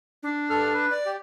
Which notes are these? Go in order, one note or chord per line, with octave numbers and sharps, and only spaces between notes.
D4
G2 A4 F6
B4
D5
G4